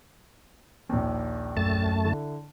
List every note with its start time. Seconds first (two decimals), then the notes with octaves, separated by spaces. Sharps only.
0.89 A#1 D#2
1.57 F#2 A3 A5
2.04 D3 E4